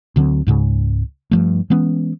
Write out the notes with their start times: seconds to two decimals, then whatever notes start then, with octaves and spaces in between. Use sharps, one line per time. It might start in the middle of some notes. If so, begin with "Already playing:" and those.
0.16 D2 D3 F#3 C4
0.47 C#2 G#2 C#3
1.31 G2 F3 A3
1.70 E3 G#3 B3 C#4